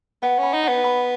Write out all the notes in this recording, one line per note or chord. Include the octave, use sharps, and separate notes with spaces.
B3 F#5
C#4 B5
D#4
F#5
B3
B5